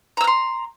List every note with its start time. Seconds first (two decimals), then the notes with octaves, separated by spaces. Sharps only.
0.17 A#5
0.21 E6
0.24 F6
0.27 C6